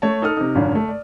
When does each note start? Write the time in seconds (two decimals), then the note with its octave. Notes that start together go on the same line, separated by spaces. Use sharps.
0.02 A3 C#5 A5
0.22 D#4 A4 D#6 F6
0.37 C3 D#4
0.55 G#1 F#2 D3 F4 C#5
0.75 A3
0.89 D5